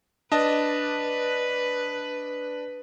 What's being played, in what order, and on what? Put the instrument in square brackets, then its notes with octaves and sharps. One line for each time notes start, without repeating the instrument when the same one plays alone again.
[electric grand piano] D4 D#5 A5 [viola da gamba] B4